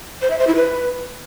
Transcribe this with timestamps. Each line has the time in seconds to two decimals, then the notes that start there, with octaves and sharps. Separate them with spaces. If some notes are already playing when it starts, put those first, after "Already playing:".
0.22 C5
0.30 E5
0.39 C5
0.47 E4
0.56 B4